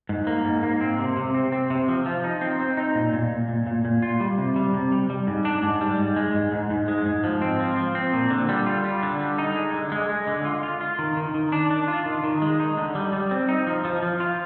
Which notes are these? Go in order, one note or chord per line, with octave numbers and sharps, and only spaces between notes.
G#2
A#3
G#2
A#3
C4
C3
C3
C4
C4
C3
F3
F3
D#4
C4
C4
D#4
A#2
A#2
A#2
A#2
A#2
A#2
F4
G3
C3
G3
C3
G3
G3
G#2
D4
G#2
G3
G#2
G#3
G#2
G#2
G#2
G#3
G#2
F3
C4
F3
F3
C4
A#2
D3
G3
F4
G3
D3
G3
D#4
G#3
D3
G#3
G#3
D3
F4
F4
F4
D#3
D#3
D#3
D4
D4
F4
D#3
D#3
G#3
D#4
D3
G3
G3
C4
D#4
F3
F3
F3
F4